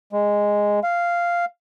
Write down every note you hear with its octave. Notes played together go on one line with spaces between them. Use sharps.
G#3
F5